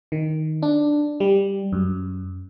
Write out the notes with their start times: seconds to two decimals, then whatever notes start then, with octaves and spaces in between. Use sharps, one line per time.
0.12 D#3
0.62 D4
1.20 G3
1.73 F#2